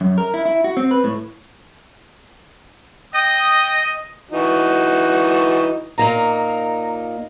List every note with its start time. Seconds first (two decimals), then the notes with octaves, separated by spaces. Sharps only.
0.01 F#2
0.18 A#4
0.34 E4
0.45 E4
0.64 F#4
0.77 C4
0.91 B4
1.04 A2
3.14 D#5 G5 D#6
4.31 E3 D#4 F#4
5.98 A#2 A#3 D#4 A#5